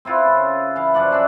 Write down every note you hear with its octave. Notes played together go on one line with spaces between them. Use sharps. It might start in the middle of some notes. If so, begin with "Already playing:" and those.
C4 E4 F4 B4
C#3
E3 F5
F#2 F3 D5 F#5
C#4 D4 E5